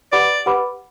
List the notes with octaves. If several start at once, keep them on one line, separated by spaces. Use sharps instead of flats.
G4 B4 D5 F#5 B5 D6
G4 B4 F#5 B5 D6